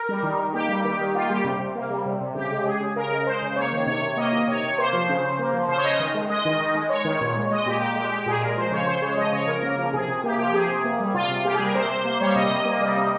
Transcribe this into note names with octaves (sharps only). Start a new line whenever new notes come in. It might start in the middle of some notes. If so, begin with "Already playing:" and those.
Already playing: A#4
G3
D#3
D#3
A#3 G4
G3
D#3 G4
D#3
A#3 F4
G3 G4
C3
C3
A#3
G3
C3
C3
C#3 G4
G#3
G#3 G#4
C#3
C#3 A#4
G#3
G#3 C5
C#3
A#3 C#5
D#3
C3 C#5
C3
A#3 D#5
D#3
C3 C#5
C3
A#3 C5
F3
C#3
C#3
A#3
F3
C#3 C5
C#5
C#3 D#5
D#3
G#3
G#3 D#5
D#3
D#3
G#3
G#3 C#5
D#3
A#2
G#3
G#3 D#5
A#2 G4
A#2 G4
G#3 G4
G#3 G4
A#2 G#4
G#3 A#4
F3 C5
C#3 C#5
C#3 C5
G#3 C#5
F3 D#5
C#3 C#5
C#3 A#4
A#3
F3
C3 G#4
C3
A#3 G4
F3 G4
C3 G#4
C3
A#3
G3
C3 F4
C3
A#3 G4
G#4
G3 A#4
C3 C5
C3 C5
A#3 C5
G3 C#5
C3 D#5
C3
A#3
G3
C3